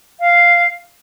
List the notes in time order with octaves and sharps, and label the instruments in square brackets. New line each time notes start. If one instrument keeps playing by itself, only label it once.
[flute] F5